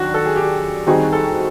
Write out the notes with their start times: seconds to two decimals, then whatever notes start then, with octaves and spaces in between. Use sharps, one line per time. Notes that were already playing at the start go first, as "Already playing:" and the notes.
Already playing: D#3 F#3 D4 F#4
0.14 A4
0.26 G#4
0.36 G4
0.87 D#3 G3 C4 D#4 F#4 G#4
1.13 A4